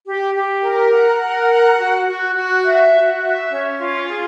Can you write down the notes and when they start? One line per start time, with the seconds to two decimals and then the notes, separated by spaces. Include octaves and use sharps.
0.06 G4
0.34 G4
0.63 A#4
0.92 F#5
1.21 A#4
1.49 F#5
1.78 F#4
2.07 F#4
2.36 F#4
2.64 E5
2.93 F#4
3.21 E5
3.50 C#4
3.78 F4
4.07 G#4